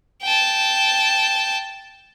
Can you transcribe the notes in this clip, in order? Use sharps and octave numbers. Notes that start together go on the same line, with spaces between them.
G5 A5